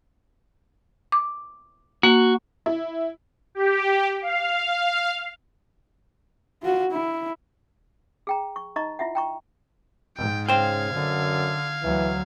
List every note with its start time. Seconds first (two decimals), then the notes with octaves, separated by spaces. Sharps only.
1.12 D6
2.03 A#3 F#4
2.66 E4
3.55 G4
4.22 F5
6.62 F4 F#4
6.92 E4
8.27 G#4 G5 A#5
8.56 C#6
8.76 D#4 D#5 A#5 C#6
8.99 E4 F4 E5 F#5
9.15 G5 A#5 C#6
10.17 G#2 G5
10.49 C#3 C5 F5 G5 G#6
10.93 F#2 D3
11.83 D2 E3 F#3